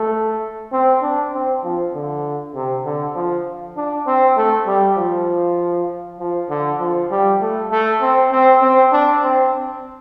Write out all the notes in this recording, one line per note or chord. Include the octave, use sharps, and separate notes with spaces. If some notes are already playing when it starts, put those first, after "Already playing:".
Already playing: A3
C4
D4
C4
F3
D3
C3
D3
F3
D4
C4
A3
G3
F3
F3
D3
F3
G3
A3
A3
C4
C4
C4
D4
C4